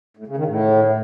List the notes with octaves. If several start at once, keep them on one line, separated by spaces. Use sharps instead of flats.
A2
C#3
D#3
A2